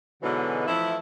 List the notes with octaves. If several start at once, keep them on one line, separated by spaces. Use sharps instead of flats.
G#2 B2 D3 E3 F#3 G#3
E3 F3 A3 E4